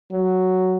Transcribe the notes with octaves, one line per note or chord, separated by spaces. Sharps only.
F#3